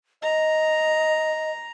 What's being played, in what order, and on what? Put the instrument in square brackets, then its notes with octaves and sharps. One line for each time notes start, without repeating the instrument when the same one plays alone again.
[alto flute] D#5 [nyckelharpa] A#5